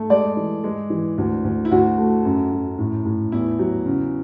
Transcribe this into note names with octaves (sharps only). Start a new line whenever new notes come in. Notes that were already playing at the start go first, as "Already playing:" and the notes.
Already playing: A3
G#3 D5
E3
G#3
E3
D2
D2
E4
D2 F#4
A3
F#2
F#2
A2
A2
E2 E4
F#3
C#3